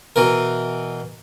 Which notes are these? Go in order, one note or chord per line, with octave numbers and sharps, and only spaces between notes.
B2 E3 A#4